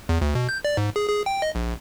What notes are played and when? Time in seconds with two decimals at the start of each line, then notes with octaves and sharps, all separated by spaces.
0.09 E2
0.21 D2
0.35 B2
0.49 G6
0.65 D5
0.77 G#2
0.96 G#4
1.08 G#4
1.26 G5
1.42 D#5
1.55 A#1